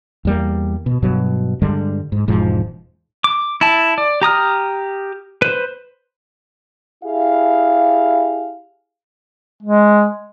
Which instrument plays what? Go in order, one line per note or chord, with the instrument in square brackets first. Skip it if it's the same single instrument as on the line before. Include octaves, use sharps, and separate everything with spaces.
[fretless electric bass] E2 G3 A#3
B2
G2 B2 F#3
G2 D3 G3 G#3
G#2
E1 G#2 F3
[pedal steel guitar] D6
E4 A5
D5
G4 A#5 D#6 F6
B4 C5
[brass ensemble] E4 G4 G#4 F5
[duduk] G#3